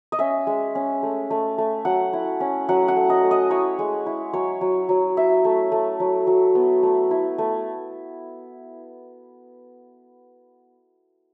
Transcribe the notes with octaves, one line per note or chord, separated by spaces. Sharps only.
D#5
C#4 E5
G#3
C#4
A3
A3
A3
F#3 F#5
E4
C#4
F#3 F#5
F#5
A3
D#5
A3
D#5
E4 C#5
G#3
E4
F#3 C#5
F#3
F#3
E4 E5
A3
A3
F#3
F#3
B3
A3
E4
A3